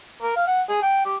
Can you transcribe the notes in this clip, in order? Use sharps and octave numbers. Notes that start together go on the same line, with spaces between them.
A#4
F5
F#5
G#4
G5
G4